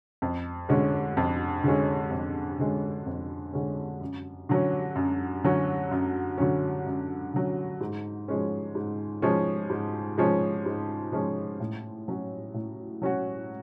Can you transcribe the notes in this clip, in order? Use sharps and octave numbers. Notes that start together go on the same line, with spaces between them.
F2
D3 G#3 C#4
F2
D3 G#3 C#4
F2
D3 G#3 C#4
F2
D3 G#3 C#4
F#2
D3 F#3 C#4
F#2
D3 F#3 C#4
F#2
D3 F#3 C#4
F#2
D3 F#3 C#4
G#2
F3 G#3 C#4
G#2
F3 G#3 C#4
G#2
F3 G#3 C#4
G#2
F3 G#3 C#4
A2
F#3 C#4 F#4
A2
F#3 C#4 F#4